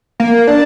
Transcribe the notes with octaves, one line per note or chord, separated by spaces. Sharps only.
A#3
D4